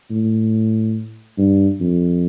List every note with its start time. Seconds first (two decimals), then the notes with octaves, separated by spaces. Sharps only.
0.10 A2
1.38 G2
1.80 F2